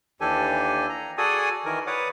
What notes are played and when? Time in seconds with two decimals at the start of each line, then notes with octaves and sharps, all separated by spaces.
0.21 D#2 E3 D4 G4 A4 G#5
0.89 A#5
1.18 F#4 G#4 A4 D5 G#5 D#6
1.65 D#3 E3 A#4 G#5
1.87 B4 C#5 D5 F#5 D6 D#6